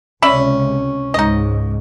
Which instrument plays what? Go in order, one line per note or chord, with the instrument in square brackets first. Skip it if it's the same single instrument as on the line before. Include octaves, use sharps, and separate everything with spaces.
[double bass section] C#2 C3 [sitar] C#4 [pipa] D5 E5 B5
[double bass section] C#2 G#2 [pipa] D#4 D#5